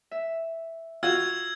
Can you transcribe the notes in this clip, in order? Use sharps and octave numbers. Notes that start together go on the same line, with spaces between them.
E5
F4 F#4 E6 G#6